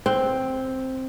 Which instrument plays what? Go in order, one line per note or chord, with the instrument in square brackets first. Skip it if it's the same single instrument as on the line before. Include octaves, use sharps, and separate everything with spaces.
[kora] C4